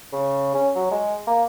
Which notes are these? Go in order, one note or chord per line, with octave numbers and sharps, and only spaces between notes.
C#3
C#4
F#3
G#3
A#3